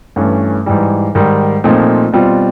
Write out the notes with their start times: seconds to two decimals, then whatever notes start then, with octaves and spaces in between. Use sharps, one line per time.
0.16 G2 E3 A3 C#4
0.66 G#2 E3 G3
1.15 G#2 D#3 G3
1.64 A#2 F3 A3 C4 D#4
2.12 B2 G3 C4 F4